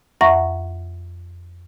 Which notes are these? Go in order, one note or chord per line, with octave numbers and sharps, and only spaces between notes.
F2 E5 F#5 A#5 C#6 A#6